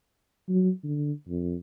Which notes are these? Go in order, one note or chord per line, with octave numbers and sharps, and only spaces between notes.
F#3
D3
F2